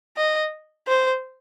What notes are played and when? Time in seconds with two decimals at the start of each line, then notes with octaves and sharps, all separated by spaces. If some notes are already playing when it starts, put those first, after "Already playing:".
0.17 D#5
0.88 C5